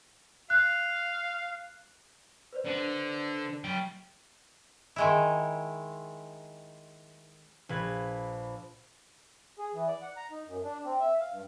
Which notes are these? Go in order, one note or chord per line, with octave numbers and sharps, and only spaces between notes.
F5 F#6
B4 C5 D5
D3
F#3 G5
D#3 G#3 E4
A#1 B4 G#6
G#4
E3
D5
F#5
A#5
D#4
F#2
D4
C4
E5
F5
G2